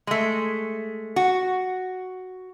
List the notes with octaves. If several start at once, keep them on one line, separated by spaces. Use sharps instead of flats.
G#3 A3
F#4